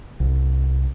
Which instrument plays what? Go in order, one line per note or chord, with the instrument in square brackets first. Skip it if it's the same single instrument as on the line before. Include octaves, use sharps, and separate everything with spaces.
[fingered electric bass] C2